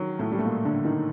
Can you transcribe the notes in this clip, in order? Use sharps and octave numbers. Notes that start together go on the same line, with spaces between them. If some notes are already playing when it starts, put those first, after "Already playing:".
Already playing: D#3 F#3
A2 A3
G3
A3
A#2 A#3
D3 D4
D#3 D#4